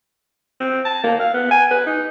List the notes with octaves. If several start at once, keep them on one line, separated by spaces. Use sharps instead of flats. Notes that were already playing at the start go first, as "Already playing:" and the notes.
C4
A5
A#3
F5
B3
G#5
B4
D#4